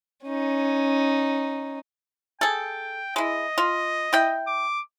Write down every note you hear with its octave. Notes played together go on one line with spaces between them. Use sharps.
C#4 D#4
G#4 A4 G5
G#3 E4 D#5
F4
E4 G5
D6